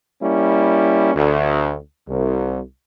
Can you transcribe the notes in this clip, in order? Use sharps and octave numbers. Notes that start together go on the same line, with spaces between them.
G3 A#3 C#4 E4
D2
C2